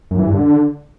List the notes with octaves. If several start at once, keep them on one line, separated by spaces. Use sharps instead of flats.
F#2
E3
G2
D3